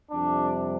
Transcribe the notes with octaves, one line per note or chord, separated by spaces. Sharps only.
F2 C3 G3 D4